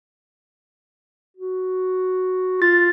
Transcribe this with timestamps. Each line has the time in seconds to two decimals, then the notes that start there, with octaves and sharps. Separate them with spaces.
1.37 F#4
2.62 F4 A6